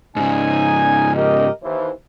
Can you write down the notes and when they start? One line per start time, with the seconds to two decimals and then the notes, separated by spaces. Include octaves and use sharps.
0.16 G#2 C#3 D#4 G#5
1.15 G4 A#4 D#5
1.63 D#2 E3 C5